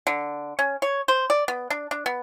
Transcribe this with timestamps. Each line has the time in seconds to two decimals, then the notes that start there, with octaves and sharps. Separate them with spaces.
0.07 D3
0.59 C#4
0.82 C#5
1.08 C5
1.30 D5
1.48 B3
1.70 D4
1.91 D4
2.06 B3